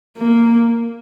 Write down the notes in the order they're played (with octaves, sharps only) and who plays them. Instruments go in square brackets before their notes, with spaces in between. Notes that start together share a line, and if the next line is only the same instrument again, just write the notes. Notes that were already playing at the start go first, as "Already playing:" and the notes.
[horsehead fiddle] A#3